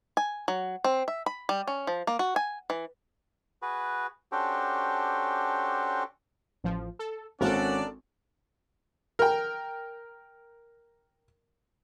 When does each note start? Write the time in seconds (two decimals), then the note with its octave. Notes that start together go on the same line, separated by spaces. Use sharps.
0.17 G#5
0.48 F#3
0.84 C4
1.08 E5
1.26 B5
1.49 G3
1.67 C#4
1.87 F3
2.07 A#3
2.19 F#4
2.36 G#5
2.70 E3
3.62 F#4 G#4 B4
4.32 C#4 D4 F#4 G4 A4 C5
6.64 A1 F3
6.99 A4
7.41 G#1 C#4 D4 A4 A#4 D5 F#5
9.19 A#4 G5